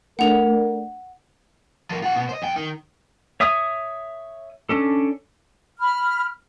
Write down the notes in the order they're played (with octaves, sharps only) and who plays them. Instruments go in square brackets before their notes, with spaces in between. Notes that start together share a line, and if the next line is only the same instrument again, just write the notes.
[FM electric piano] A3 D4 [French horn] A#4 [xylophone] F#5 F7
[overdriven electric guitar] F3 A#4
F4 F#5
B2 B3
C5 D#5
F2 G5
D#3
[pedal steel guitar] C#5 E5 D#6
C#4 D4 A4
[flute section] B5 F6